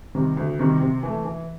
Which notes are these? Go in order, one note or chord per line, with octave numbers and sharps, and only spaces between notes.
C3 D#3 G3
D2
C3 D#3 G3
C3
E3 A3
E3